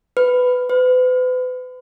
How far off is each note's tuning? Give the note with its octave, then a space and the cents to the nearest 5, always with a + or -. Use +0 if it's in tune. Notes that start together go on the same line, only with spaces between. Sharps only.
B4 +15
B4 +40